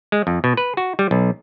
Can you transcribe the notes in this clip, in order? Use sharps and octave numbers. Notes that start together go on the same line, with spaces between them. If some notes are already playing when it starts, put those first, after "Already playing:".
G#3
F2
B2
B4
F#4
G3
B1